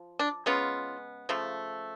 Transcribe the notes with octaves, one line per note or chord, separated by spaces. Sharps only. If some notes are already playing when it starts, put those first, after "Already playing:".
Already playing: F3
D4
C#3 G#3 B3 C#4 F4
C#3 F3 A3